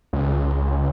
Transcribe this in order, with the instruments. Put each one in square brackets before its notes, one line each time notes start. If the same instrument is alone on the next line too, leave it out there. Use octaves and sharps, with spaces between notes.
[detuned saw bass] C#2